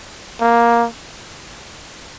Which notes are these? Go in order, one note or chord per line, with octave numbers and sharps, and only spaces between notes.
A#3